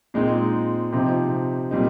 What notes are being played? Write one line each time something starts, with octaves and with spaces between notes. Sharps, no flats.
A#2 G#3 C4 D#4
C3 F3 C4 D#4
A#2 G3 C4 D#4